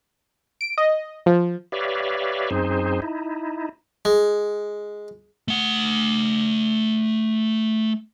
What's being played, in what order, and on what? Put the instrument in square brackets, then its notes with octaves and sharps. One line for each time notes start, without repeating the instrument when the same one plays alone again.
[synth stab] D7
D#5
F3
[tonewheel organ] G4 B4 C#5 D5 E5 F5
F#2 C4 D#4 G#4 C5
D#4 E4
[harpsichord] G#3
[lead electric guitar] A3 F#5